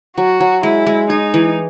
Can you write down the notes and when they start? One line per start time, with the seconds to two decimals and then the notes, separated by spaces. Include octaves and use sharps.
0.17 F#3 F#4
0.40 F#3
0.63 G#3 E4
0.87 G#3
1.10 D#4 G#4
1.34 E3